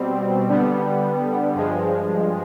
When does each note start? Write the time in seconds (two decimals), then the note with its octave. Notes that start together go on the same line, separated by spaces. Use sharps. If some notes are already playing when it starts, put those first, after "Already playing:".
Already playing: B2 G3 C4
0.49 D3 G3 B3
1.55 G2 F3 G#3